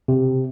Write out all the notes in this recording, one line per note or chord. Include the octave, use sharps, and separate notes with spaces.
C3